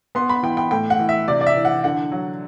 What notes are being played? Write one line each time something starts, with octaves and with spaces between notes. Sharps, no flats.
B3 C6
B5
E3 G5
G5
A2 G5
F#5
E3
E5
C3 D5
D5
E5
E3
F#5
D3 F#5
F#3